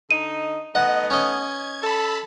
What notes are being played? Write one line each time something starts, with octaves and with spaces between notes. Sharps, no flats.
D3 D#4 D#7
A3 B3 D#4 D#5 F#5
C#4 D#5 G#6
A4 A5 B5